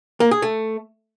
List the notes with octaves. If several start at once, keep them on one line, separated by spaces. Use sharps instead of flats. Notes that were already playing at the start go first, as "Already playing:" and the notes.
A#3
G#4
A3